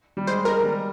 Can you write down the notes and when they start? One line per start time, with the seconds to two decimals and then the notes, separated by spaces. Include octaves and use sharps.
0.17 G3
0.27 G#3 C5
0.45 G#3 A#4
0.64 G3